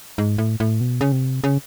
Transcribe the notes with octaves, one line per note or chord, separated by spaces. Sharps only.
G#2
A2
A2
B2
C#3
C3
C#3